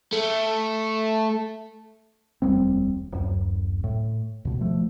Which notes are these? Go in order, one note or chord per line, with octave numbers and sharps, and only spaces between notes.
A3
F1 D#2 G3 C4
D1 F#2
A2
D#2 B2
F3 A3